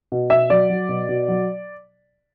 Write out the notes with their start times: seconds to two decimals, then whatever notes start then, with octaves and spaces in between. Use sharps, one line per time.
0.12 B2
0.30 B2 E5
0.50 F#3 D5
0.70 F#3
0.89 B2
1.09 B2
1.28 F#3